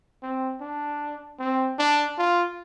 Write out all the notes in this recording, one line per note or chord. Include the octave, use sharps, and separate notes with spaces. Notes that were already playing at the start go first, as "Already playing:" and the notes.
C4
D4
C4
D4
F4